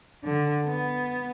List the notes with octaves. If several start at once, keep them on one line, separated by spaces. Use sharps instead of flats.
D3
B3